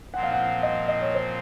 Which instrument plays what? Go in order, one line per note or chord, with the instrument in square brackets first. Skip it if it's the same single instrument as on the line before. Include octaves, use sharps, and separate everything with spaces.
[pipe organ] A#2 F3 C4 [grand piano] F#5
[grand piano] F5
F#5
D#5
D#5
C#5
C5